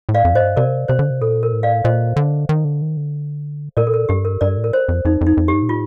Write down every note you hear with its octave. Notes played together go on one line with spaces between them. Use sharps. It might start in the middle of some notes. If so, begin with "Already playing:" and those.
A2
D5 F5
F2
A2 C5 D#5
G2
C3 A#4 D5
C3 C5
D3
C3
A#2 A4
A#4
A2
D5 F5
A#2 C5 D#5
D3
D#3
D3
D#3
D3
A#2 A#4 D5
A4
A#4
G2 G4
A#4
G2 A#4 D5
A2
A#4
C5
F2
F2 D#4
F2
D#4
F2
G4
G2
A#2
A2 F4